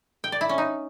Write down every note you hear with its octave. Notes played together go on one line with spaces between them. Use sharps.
G5
D5
E4
C#4
D#4